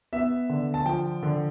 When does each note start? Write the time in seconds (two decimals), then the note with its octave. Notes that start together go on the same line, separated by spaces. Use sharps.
0.13 B3 E5
0.49 D3
0.74 A5
0.85 F3 G5
1.23 D3